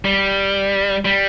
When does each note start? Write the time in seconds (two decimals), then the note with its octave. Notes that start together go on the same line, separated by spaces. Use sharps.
0.05 G3
1.05 G3